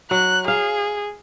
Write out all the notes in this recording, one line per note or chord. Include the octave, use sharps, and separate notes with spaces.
F#3 F#6
G#4 F5